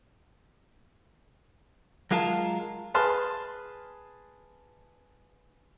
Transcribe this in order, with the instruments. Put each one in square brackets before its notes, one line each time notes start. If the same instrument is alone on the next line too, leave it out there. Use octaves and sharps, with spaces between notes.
[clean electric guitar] F#3 G#3 F4 A#4 A5
[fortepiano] G#4 B4 A5 C6 F6